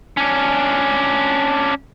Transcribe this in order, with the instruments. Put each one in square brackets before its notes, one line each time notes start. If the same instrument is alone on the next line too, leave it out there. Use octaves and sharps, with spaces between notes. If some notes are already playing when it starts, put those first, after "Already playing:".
[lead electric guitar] C#4 D4